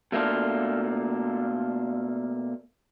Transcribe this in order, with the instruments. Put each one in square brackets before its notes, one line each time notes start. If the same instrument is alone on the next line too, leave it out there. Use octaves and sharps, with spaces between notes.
[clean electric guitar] B2 A3 A#3 D4 F4